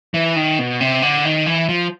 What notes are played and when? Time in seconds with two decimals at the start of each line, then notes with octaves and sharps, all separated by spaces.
0.14 E3
0.36 D#3
0.59 B2
0.81 C3
1.02 D3
1.25 D#3
1.46 E3
1.69 F3